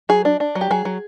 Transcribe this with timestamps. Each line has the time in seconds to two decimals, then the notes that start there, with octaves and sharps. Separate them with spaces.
0.09 F#3 G#4
0.25 D4
0.40 D4
0.55 F#3
0.61 G4
0.71 F#3 G#4
0.85 F#3